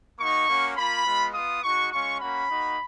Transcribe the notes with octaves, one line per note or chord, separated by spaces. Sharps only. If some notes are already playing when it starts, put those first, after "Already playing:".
A#3 D#4 F#4 C#6
A#3 C#4 F#4
A#3 F4 B5
G#3 B3 F4
B3 F4 D#6
G#3 D#4 F#4 C#6
G#3 C#4 F4 C#6
A#3 C#4 F#4 B5
A#3 D#4 F#4